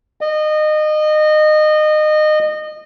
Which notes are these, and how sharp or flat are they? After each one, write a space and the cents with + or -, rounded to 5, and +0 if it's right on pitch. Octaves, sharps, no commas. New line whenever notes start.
D#5 -25